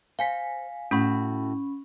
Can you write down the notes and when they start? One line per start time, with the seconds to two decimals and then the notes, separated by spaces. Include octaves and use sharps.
0.19 C5 F5 G#5 B6
0.91 A2 C#4 F#4 B5 C#6